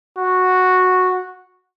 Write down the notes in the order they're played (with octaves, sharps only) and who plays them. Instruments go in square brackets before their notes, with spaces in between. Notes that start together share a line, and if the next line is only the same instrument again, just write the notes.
[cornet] F#4